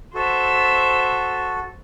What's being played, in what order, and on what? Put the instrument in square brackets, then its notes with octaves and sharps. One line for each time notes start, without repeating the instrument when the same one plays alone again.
[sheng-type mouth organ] F#4 A4 [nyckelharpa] C5 E5